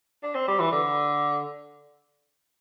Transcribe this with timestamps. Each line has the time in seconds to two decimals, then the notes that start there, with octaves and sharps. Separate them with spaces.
0.23 D4
0.35 C4
0.48 G3
0.60 E3
0.72 D3